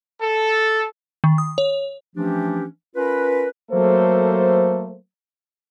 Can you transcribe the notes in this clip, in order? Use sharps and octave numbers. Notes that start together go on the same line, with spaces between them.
A4
D#3
D#6
C#5
E3 F3 A3 C#4 D4 G4
C#4 F4 A#4 B4
F#3 A3 A#3 A4 C5